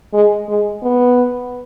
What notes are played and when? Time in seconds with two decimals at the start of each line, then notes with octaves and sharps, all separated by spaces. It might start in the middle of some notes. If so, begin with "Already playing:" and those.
0.13 G#3
0.48 G#3
0.83 B3